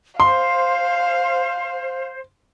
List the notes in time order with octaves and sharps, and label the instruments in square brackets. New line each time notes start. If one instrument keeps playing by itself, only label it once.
[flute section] C5 [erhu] F5 [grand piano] C6